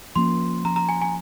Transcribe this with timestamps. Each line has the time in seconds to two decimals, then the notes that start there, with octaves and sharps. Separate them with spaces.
0.16 F3 A#3 C#4 C6
0.64 F3 A#3 C#4 A#5
0.76 A#5
0.89 G#5
1.02 G#5